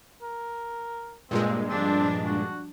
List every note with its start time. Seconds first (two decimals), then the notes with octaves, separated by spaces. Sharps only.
0.22 A#4
1.31 G2 A#2 G#3 C4
1.68 F3 G3 C4 D4
2.26 F#4